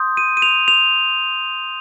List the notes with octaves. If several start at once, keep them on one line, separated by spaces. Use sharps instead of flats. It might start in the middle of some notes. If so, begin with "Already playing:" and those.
Already playing: C6 D#6 G6
D#7
D#7
F7
F7